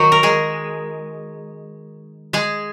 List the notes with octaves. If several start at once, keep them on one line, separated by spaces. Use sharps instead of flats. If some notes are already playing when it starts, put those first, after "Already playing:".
Already playing: D#3 F#3 D#4 F#4
A#4
G#3 G#4
G#3 G#4